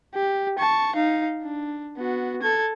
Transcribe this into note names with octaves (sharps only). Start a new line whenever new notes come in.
G4
A5 C#6
D#4 F5
D4
B3 F#4
A4 G#6